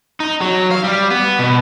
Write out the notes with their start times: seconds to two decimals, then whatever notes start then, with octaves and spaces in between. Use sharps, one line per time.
0.20 D#4
0.41 F#3
0.71 F5
0.84 G3
1.10 B3
1.39 B2